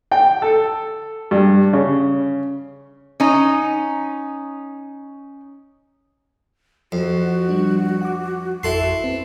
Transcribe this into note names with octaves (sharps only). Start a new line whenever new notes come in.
G5
A4
G2
C#3
C#4 D#4
F2 F#4
F3 G3 D4
F#5 D6
G#1 F2 E4 A4 C6
C4 B4